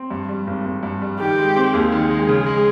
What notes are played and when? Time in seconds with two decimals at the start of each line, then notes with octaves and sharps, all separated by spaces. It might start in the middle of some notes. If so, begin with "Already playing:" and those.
Already playing: C4
0.10 G2
0.29 G3
0.47 G#1
0.65 G#1
0.83 G2
1.02 G3
1.20 D#3 G4
1.37 G#3
1.56 C4
1.73 D#2 G#4
1.92 D#3
2.10 G#3
2.28 C#3
2.46 G#3